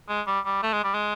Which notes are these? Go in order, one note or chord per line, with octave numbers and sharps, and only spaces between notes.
G#3
G3
G3
A3
G#3
G3
G#3